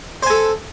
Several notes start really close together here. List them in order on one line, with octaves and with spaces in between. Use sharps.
C5 G#5 A4